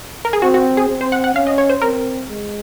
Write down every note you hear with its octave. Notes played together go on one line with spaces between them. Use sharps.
A#4
G#4
C4 F#4
F#4
G#4
C4
C5
F#5
F#5
C#4 F5
D#5
C#5
C5
C4 A#4
G#3